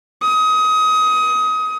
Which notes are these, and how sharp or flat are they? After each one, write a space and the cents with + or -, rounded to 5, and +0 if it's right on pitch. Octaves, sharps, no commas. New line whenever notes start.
D#6 +25